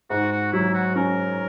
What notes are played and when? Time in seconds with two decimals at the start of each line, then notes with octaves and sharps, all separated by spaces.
0.10 G#2 F#4
0.32 F#4
0.53 F#3 E4
0.74 F#4
0.95 C#4 A#4